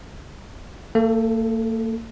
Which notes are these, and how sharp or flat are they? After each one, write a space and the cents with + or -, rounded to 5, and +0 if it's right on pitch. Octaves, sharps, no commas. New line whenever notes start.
A#3 -45 A4 +0